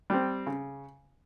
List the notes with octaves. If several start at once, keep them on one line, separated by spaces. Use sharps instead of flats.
G3 C4
C#3